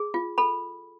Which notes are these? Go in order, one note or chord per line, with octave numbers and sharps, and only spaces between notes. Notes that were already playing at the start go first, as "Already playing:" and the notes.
Already playing: G#4
F4
A4 B5